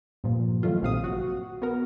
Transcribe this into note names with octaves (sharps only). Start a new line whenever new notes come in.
G2 A#2 F3
D#3 F#3 A3 F4
A#1 C3 F5 D#6
F#4
B3 F#4 A#4